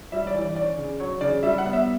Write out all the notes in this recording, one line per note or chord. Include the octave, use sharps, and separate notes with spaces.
G3 E5
D5
E3
D5
C#4 D5
C#3
F#3 C#5
C#3 D5
G3 E5
F#5
B3
E5